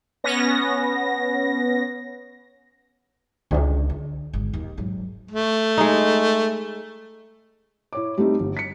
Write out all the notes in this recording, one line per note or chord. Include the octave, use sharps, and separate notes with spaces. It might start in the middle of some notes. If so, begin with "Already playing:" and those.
B3 C#4 A#6
C#2 D4
D3
G#1
D#2
G#1 F#3
A3
G#3 D#4
E4 C#5 D6
G3 A3 C4 D#4
G1
B6 C#7